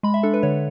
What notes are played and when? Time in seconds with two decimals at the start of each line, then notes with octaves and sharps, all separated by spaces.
0.03 G#3 B5
0.14 E5
0.23 D4 A4
0.34 B4
0.43 D3 C#5